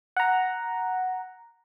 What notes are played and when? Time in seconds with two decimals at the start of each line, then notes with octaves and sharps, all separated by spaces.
0.17 F#5 A#5